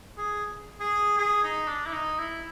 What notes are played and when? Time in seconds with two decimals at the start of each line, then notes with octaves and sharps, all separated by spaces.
0.18 G#4
0.80 G#4
1.18 G#4
1.43 D#4
1.68 D4
1.87 E4
1.93 D#4
2.19 E4